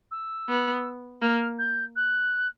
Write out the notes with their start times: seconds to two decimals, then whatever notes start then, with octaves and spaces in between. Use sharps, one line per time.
0.11 E6
0.48 B3
1.21 A#3 F6
1.58 G6
1.96 F#6